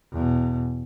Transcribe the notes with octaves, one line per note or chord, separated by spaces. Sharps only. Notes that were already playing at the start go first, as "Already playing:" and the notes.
E2 B2